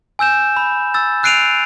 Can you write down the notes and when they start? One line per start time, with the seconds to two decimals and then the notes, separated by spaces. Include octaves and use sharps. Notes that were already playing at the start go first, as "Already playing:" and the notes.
0.19 G#5 E6 G6 E7
0.57 B5
0.94 E6 A6
1.23 E6 F#6 C7 D7 D#7 F7